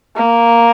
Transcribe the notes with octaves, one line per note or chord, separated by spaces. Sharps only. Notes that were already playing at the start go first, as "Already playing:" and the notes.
A#3